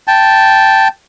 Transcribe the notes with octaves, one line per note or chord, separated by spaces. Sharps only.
G5 A5